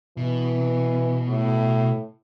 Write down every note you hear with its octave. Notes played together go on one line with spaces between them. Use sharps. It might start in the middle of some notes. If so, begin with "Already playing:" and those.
B2 E3
A2